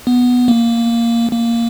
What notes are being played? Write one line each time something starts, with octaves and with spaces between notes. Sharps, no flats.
B3
A#3
A#3